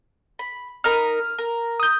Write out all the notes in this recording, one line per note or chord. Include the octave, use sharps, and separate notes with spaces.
B5
D#4 A#4 B5 F6
A#4
D#6 G6